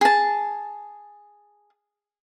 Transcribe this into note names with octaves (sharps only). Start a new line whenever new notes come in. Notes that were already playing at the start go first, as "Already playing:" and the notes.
G#4 A5